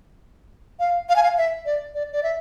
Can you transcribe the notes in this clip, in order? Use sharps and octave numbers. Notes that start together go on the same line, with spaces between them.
F5
F5
G#5
F5
E5
D5
D5
D5
E5